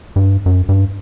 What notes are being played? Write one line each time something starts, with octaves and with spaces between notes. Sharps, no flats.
G2
F#2
G2